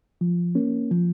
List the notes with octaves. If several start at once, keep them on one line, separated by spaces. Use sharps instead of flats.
F3
A#3 C#4
F3